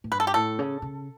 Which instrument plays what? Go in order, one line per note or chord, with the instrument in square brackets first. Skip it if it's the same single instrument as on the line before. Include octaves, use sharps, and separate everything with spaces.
[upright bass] A2
[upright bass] G2 [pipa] B4
[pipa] A4
G4
[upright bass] A2 [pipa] A4
[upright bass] C#3
C#3